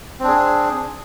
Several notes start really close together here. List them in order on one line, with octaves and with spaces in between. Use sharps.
C4 D4 G#4